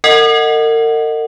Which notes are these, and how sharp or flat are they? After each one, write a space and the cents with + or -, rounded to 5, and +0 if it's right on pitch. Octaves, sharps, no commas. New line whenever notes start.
A#4 -40 D#5 +0 F#5 +0